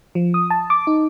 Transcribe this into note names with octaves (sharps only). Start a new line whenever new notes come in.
F3
D#6
A5
D6
D#4